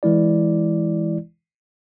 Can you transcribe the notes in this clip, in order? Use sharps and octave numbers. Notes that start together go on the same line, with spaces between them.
E3 G#3 E4 D5